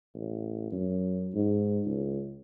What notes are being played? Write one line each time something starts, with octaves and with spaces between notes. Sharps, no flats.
A1
F#2
G#2
C#2